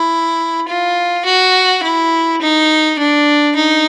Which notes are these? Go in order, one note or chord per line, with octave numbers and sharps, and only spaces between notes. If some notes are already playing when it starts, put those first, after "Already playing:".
Already playing: E4
F4
F#4
E4
D#4
D4
D#4